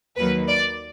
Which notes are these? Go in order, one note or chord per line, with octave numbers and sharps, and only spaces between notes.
D#2 D#3 F#3 A#3 B4
D5